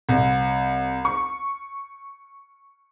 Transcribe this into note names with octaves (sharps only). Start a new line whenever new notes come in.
C2
C#6